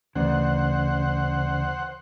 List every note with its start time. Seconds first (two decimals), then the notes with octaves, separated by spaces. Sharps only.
0.15 D2 C#3 E3 C5 D5 F#5